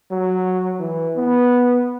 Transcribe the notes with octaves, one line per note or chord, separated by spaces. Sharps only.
F#3
E3
B3